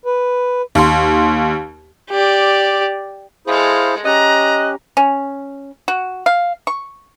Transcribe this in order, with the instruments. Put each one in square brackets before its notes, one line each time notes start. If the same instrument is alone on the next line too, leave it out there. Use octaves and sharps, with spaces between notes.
[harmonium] B4
[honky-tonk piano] D#2 C6
[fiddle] G4 D5
[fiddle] G#3 A4 [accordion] E4 G#4 C5 [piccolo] F5
[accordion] C#4 G4 [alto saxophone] D#5 [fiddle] A#5 [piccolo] F#6
[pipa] C#4
F#4
F5
C#6